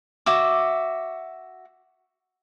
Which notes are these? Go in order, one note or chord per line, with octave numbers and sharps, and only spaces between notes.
F#4 E5 D6